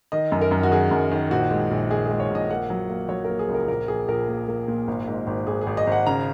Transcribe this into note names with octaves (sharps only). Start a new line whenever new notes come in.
D#3 D#5
F#2
A#4
F#2
F#4
D#3 G#4
F#2
D#3
A#1 F#4
G#3
A#1
G#3 G#4
G#4
G#3
C#5
A#1
D#5
A#3 F#5
F#3
A#3
F#3 C#5
A#4
A#3
G#4
C#2
A#4
A#1 A#4
A#1 G#4
A#1 A#4
A#3
A#3
A#2
G#1
G#2
G#1
G#1 G#4
G#4
G#1
D#5
G#1
F#5
C#3 A#5